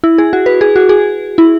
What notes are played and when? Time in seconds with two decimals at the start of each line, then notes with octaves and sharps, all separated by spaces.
0.04 E4
0.18 G#4
0.33 F#4
0.46 B4
0.61 G#4
0.76 F#4
0.89 G#4
1.38 E4